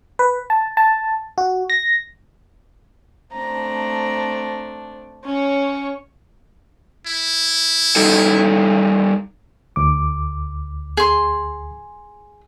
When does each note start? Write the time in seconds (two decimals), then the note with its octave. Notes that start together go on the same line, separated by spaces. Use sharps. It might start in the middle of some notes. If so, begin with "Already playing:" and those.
0.19 B4
0.50 A5
0.77 A5
1.38 F#4
1.70 A#6
3.33 A3 C4 D4 A#5
5.25 C#4 C#5
7.07 E4
7.96 G3 D#4 A4
9.76 D2 D6
10.97 G#4 C6